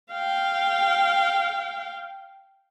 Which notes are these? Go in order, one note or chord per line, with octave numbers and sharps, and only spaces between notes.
F5 G5